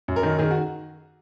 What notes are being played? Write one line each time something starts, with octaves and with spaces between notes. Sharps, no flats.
F#2
A#4
D#3
D#3 G#4
F#4